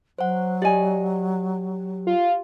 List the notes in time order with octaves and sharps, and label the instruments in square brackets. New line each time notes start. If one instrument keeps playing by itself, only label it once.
[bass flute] F#3 [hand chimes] C5 F#5
[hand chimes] G4 [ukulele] D5 D#5 G#5
[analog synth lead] F4